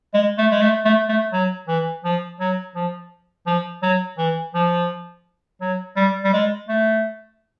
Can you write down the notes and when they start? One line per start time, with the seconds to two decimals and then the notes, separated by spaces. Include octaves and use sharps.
0.14 G#3
0.38 A3
0.52 G#3
0.62 A3
0.85 A3
1.09 A3
1.33 F#3
1.68 E3
2.04 F3
2.40 F#3
2.76 F3
3.47 F3
3.83 F#3
4.18 E3
4.54 F3
5.61 F#3
5.96 G3
6.24 G3
6.33 G#3
6.68 A3